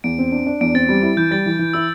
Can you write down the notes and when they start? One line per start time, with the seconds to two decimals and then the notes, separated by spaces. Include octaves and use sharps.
0.04 E2 D7
0.18 C4
0.32 D4
0.46 D4
0.61 E2 D7
0.74 C4 A6
0.89 G3
1.03 E4
1.17 E3 G6
1.31 G3 A6
1.46 E3
1.59 E3
1.74 E4 E6